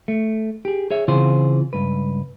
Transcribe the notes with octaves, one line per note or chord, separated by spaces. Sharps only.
A3
G4 G#4
G#4 C#5 E5
C#3 E3 C4 F4 G#4 C5
C#2 G2 B4